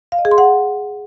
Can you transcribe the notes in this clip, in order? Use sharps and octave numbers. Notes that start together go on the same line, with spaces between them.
F5
D#5
G#4
C6
F#5